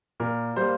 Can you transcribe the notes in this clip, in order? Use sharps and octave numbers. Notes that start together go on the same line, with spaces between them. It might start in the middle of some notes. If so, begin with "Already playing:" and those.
A#2 A#4
G3 A#3 C5